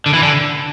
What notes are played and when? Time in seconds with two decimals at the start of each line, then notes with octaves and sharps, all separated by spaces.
0.06 D3
0.14 E3
0.23 D3